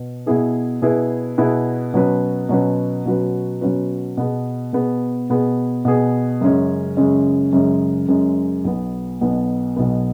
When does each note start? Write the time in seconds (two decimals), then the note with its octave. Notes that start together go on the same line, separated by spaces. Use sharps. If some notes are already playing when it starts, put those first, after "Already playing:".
Already playing: B2
0.26 B2 B3 E4 G#4 B4
0.82 B2 B3 E4 G#4 B4
1.38 B2 B3 E4 G#4 B4
1.94 B2 F#3 C#4 F#4 B4
2.49 B2 F#3 C#4 F#4 B4
3.05 B2 F#3 C#4 F#4 B4
3.61 B2 F#3 C#4 F#4 B4
4.17 B2 B3 G#4
4.73 B2 B3 G#4
5.30 B2 B3 G#4
5.85 B2 B3 G#4
6.41 F#2 C#3 G#3 C#4
6.97 F#2 C#3 G#3 C#4
7.53 F#2 C#3 G#3 C#4
8.09 F#2 C#3 G#3 C#4
8.65 B1 B2 B3
9.21 B1 B2 B3
9.76 B1 B2 B3